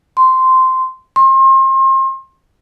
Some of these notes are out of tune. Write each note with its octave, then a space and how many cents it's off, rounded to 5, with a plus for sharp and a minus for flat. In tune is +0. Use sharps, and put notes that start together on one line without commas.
C6 -10
C6 +35